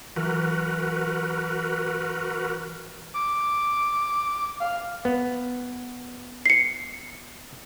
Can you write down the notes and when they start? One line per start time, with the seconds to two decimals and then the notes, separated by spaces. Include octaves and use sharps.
0.16 E3 F#3 F#4 A#4 B4
3.14 D6
4.60 F5
5.05 B3
6.46 C7 C#7